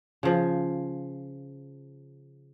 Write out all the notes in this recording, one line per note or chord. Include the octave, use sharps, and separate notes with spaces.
C#3 F3